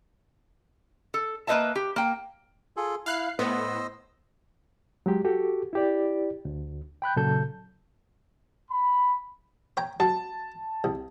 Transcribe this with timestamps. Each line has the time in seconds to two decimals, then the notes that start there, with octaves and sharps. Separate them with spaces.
1.14 A4
1.47 A#3 B4 C5 D#5 E5 A5
1.76 G4
1.96 A#3 G5
2.77 F4 G#4 A4
3.06 E4 F5 F#6 C7
3.39 A2 B3 C5 D#5 E6
5.06 F#3 G#3 G4
5.25 F#4 G4 A4
5.73 E4 G4 D5
6.45 D2
7.02 G5 B5 F#6 G6
7.16 A#2 C#3 F#3 A4 A5 G6
8.71 B5
9.77 C#5 G5 A#5
10.00 F#3 A5
10.84 C2